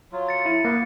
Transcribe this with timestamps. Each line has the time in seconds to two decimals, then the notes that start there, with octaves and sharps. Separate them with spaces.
0.12 F#3 F4
0.29 A6 C#7
0.46 E4
0.65 A#3 B3 B4